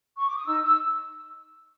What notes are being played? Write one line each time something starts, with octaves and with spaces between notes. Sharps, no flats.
C#6
D6
D#6
D#4 E6
E6